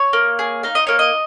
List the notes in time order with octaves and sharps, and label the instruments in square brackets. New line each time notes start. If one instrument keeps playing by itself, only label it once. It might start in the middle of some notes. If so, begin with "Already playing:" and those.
Already playing: [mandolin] C#5
A#3
G#4
D#4 F5
D#5
A#3 C#5
D#5